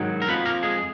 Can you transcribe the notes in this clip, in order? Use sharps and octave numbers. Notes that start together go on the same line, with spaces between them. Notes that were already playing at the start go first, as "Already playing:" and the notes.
Already playing: G#2 D#3 F#3
A#4
F2 F3 B3 B4
A#3 A#4
G#3 G#4